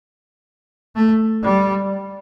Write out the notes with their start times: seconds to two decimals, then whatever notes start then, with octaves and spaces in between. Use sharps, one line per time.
0.96 A3
1.43 G3